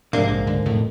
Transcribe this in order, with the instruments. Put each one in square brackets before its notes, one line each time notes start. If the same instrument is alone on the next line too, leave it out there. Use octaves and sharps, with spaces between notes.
[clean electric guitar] B1 G#2 [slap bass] C3 F3 [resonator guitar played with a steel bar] A#3 [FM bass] D4
[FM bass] A#1
[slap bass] C#2 [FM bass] D3
[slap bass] B1 F2 [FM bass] A2